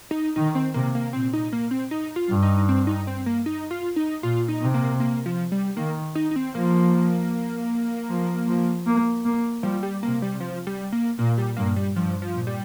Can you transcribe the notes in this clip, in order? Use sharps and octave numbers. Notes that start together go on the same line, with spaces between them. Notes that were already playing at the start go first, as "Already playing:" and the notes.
D#4
D#3 D#4
C4
C3 A#3
A#3
A#2 C4
D#4
A#3
C4
D#4
F4
G2
D#4
C4
D#4
C4
A#3
D#4
F4
D#4
A#2 F4
D#4
C3
A#3
A#3
F3
G3
D#3 A#3
D#4
D#4
C4
F3 A#3
F3
F3
A#3
A#3
F3 G3
G3
C3 A#3
G3
F3
G3
A#3
A#2 A#3
G3
G2 A#3
G3
G2 F3
F3
A#2
G3